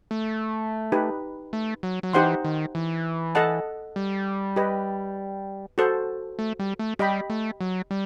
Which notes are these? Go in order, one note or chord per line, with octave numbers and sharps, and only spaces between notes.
A3
D#4 G4 B4
A3
F#3
F#3
E3 D#4 G4 C5 F#5 C6
D#3
E3
A4 D#5 F#5 A5
G3
G4 B4 D#5
F#4 A4 C5
A3
G3
A3
G3 G4 D#5 G5 B5
A3
F#3
G3